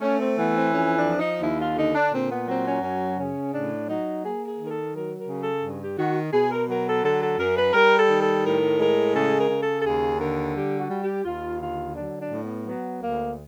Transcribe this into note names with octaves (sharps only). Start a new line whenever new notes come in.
A3 C#4
C4
E3 B3
C4
F2 C#4
D4
F3
D#4
D#2 E4
F4
D3 D#4
D4
A#2 C4
B3
F#3 C4
C#4
F#2 C#4
C#3 C#4
A2 D4
F#3 D#4
A#3 G#4
G#4
D#3
A#4
A4
F#3 A#4
A#4
C#3
A4
G2
G4
D#3 F#4
B2 G#4
A#4
F#3 A#4
A4
D3 A4
A4
F#2 A#4
B4
G3 A#4
A4
D#3
A4
A2 A#4
G#3 A#4
C#3 A4
A#4
C#3
A4
A4
D#2 G#4
D3 A#4
G3 G4
F#4
G3
G4
D#2 F4
D3 F4
F#3 D4
D4
A2
B3
F#3 B3
D2 A#3